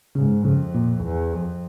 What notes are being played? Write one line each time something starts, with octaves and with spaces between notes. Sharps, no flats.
G#2 C#3
F2 C#3
A#2
E2
F2